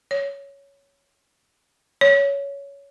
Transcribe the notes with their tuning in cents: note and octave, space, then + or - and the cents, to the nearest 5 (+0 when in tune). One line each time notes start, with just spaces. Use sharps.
C#5 +10
C#5 +15